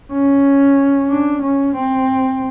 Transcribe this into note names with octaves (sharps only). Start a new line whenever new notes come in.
C#4
D4
C#4
C4